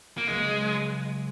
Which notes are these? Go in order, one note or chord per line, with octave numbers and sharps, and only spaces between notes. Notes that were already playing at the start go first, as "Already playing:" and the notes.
A#3
C#2 C#3 F#3 G#3